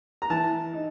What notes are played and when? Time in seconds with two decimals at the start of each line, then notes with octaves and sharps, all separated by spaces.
0.22 A#5
0.30 E3 A5
0.74 D#4